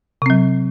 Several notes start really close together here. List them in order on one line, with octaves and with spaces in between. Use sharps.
C3 C4 F#3